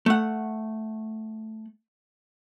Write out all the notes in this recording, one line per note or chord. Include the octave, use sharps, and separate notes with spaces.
A3 F#5